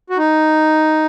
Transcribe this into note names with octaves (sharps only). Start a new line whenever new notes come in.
F#4
D#4